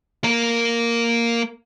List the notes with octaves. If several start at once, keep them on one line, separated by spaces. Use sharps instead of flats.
A#3 A#4